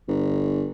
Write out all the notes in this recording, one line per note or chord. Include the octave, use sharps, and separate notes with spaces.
G1